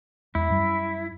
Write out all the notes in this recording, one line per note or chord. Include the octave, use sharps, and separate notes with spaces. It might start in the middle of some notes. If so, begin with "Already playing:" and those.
E2 G#3 E4
F#2 G3